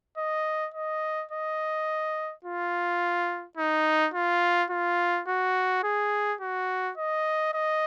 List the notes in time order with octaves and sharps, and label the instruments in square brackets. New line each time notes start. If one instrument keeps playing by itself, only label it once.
[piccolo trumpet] D#5
D#5
D#5
F4
D#4
F4
F4
F#4
G#4
F#4
D#5
D#5